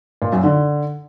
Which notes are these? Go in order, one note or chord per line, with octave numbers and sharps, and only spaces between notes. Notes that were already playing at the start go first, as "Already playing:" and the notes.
A#2
F#2
D3